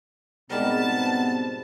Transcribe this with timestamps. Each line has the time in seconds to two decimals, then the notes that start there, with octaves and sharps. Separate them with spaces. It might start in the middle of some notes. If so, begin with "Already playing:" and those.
0.50 G#2 B2 G3 B3 C4 A#4 A5